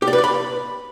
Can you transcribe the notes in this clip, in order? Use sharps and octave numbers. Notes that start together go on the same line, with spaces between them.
G4
D5
B4
D5
B5